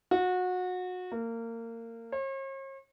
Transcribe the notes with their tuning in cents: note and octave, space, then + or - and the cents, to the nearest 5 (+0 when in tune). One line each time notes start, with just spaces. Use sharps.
F#4 -25
A#3 -25
C#5 -45